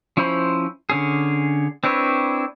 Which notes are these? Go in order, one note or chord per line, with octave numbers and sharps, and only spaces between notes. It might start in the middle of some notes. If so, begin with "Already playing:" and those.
F3 C#4 E4 C5 B5
D3 C#4 G#4
C4 D4 E4 B4 C#5